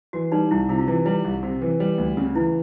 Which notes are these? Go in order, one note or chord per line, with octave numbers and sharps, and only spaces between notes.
E3 F#4
G3 D#4
C2 E4
C3 E4
F4
E3 E4
G3 E4
C2
C3
E3
G3
D2
C#3
E3 E4